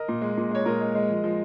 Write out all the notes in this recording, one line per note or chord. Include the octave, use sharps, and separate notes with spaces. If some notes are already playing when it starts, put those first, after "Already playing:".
Already playing: A#4 D#5
A#2
G#3
A#2
G#3 C#5
A#2 A#4 D#5
G#3
G#3
F3
F3